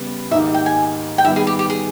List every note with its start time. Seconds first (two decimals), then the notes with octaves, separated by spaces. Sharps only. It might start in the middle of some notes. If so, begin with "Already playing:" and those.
Already playing: C#3 G3 B3 G4
0.31 G#2 D#3 A#3 D#4 G4 E5
0.54 G5
0.66 G#5
1.18 G5
1.24 D#3 G3 B3 E5
1.36 G#4
1.47 G4
1.59 G4
1.70 G#4